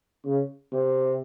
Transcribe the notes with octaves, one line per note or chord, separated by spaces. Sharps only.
C#3
C3